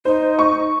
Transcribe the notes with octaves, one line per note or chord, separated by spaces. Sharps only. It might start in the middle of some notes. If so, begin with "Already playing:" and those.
D#4 C5
C#6